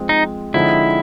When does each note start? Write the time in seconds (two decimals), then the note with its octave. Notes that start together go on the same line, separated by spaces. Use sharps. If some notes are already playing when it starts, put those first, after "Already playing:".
Already playing: F3 G#3 C4
0.09 D#4
0.54 D3 F3 G#3 C4 D#4 E4